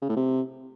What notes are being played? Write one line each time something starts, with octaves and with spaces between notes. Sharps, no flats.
C#3
A2
C3